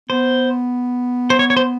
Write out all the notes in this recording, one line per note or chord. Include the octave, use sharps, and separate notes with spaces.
B3 C5
C5
C#5
C#5
C5